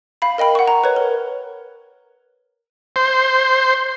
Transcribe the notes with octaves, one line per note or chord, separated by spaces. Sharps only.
F5 B5
A#4 D#5 G5 B5
F#5 C#6
A#5
B4 C#5
A#4
C5